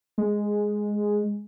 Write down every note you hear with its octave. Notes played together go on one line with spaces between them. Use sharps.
G#3